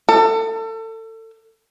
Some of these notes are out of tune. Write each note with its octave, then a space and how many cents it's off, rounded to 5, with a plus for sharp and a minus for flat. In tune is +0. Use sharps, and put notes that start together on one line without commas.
A4 +30